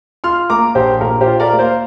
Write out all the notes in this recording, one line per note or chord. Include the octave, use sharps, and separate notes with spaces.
F4 C6 F6
A#3 A#5 D6
A#1 G4 C5
A#2 A#4
G4 C5
F4
A#4 D5
A#3
C5 F5